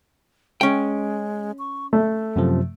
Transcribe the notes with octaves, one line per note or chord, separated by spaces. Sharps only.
G#3 C#4 G5
C#6
A3 A4
F#2 C3 F3